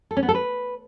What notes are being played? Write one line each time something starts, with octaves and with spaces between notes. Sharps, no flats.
A4
C#4
B3
A4
B4